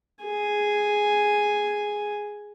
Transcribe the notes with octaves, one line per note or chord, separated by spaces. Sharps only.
G#4 G#5